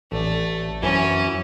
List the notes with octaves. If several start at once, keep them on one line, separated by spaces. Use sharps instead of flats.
A1 A3 D5
F#2 E3 C#4 E4